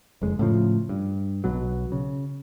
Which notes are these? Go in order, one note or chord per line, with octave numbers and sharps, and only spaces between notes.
F#1 F2 G#3
A2 C#3 F3
G2
B1 B2 F#3
C#3